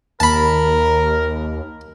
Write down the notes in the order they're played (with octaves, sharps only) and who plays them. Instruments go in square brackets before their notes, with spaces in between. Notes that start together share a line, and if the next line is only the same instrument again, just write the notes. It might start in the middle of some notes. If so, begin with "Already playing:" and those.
[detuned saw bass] D#2 [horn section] A#4 [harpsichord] A5 B5